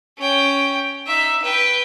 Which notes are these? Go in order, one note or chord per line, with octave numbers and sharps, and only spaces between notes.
C#4 G5
D#4 E5
B4 G5